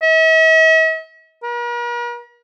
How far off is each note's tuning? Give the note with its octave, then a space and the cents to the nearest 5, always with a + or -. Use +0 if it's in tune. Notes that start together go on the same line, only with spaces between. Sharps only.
E5 -45
A#4 +45